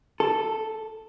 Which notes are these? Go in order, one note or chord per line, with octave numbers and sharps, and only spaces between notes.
A4